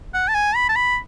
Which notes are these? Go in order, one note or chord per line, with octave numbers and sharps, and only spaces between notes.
F#5
A5
G#5
B5
A5
B5